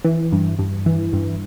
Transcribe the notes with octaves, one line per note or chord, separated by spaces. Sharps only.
E3
G2
G2
E3
G2